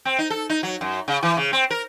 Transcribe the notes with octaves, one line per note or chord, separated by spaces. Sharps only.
C4
D#4
A4
D#4
F#3
F#2
C#3
E3
C#3
C4
A#4